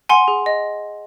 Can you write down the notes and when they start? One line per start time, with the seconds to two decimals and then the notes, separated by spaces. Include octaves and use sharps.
0.09 F#5 G#5 C6
0.28 G#4
0.46 D#5